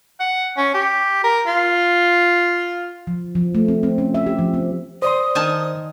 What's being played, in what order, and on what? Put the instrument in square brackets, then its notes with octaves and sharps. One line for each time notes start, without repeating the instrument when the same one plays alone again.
[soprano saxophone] F#5
C#4
G4
A#4
F4
[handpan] F3
F3
A3
C4
C4
C#4
E5
G4
F3
C4
[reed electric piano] C5 D5 C6 [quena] D#6
[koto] D#3 G#5 A5